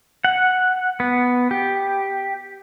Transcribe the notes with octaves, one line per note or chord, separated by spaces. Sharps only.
F#5
B3
G4